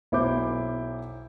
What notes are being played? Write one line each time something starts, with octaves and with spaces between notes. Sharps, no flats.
B1 E4 C5 D6 G6